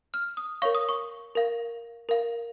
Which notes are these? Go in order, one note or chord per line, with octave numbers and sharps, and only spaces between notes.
F6
D#6
A#4 C#5 F5 C#6
D#6
C#6
A#4 F5
A#4 F5